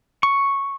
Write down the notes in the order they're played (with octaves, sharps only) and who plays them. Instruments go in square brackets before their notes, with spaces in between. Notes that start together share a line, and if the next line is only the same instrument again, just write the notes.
[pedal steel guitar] C#6